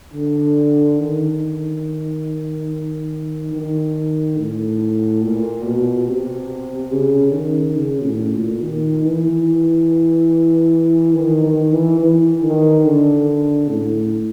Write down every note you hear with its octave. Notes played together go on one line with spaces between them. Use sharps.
D3
D#3
D#3
A2
A#2
B2
C3
C#3
D#3
C#3
A2
A#2
D#3
E3
D#3
D#3
E3
E3
D#3
D3
A2